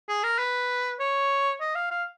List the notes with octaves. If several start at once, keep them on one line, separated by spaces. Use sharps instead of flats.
G#4
A#4
B4
C#5
D#5
F5
F5